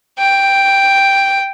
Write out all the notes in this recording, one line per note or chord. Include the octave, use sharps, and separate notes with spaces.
G5